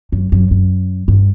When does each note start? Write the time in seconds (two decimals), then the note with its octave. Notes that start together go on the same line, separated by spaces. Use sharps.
0.12 F#2
0.32 F#2
0.51 F#2
1.08 G2